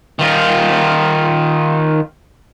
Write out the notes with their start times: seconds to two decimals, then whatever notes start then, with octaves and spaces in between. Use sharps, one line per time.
0.19 D#3 F4